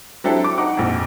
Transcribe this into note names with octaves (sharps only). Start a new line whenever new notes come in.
F#3 C4 D4 E4 G4 A4
D6
D#4 F#5 D6
A#1 F2